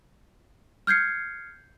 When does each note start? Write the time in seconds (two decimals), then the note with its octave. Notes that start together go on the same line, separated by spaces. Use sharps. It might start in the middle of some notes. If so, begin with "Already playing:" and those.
0.87 F6 G6 G#6 C7 C#7